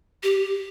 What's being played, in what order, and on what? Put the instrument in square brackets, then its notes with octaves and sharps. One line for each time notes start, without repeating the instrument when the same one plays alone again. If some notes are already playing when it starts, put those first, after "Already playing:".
[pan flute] G4